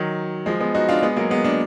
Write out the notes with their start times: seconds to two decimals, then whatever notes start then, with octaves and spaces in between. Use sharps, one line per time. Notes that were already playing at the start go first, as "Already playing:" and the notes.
Already playing: D#3 F#3
0.46 F3 G#3
0.60 G#3 B3
0.75 D#4 F#4
0.89 D4 F4
1.02 G#3 B3
1.17 F#3 A#3
1.30 G#3 B3
1.44 A#3 D4